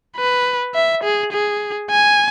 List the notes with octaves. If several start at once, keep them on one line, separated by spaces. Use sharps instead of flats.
B4
E5
G#4
G#4
G#5